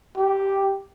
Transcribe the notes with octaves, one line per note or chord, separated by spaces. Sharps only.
G4